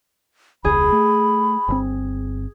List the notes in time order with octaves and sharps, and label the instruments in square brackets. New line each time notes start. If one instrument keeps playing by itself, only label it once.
[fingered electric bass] E1 C#2 [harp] G#4 [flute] B5
[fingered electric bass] A3
G1 C3 C4